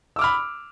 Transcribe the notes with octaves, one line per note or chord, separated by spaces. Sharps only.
B5 D6 E6 F6